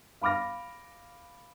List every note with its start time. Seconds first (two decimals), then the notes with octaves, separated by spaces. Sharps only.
0.21 F5 B5 D6 F6 A#6